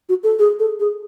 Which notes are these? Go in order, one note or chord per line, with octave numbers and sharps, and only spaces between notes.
F#4
A4
G#4
A4
G#4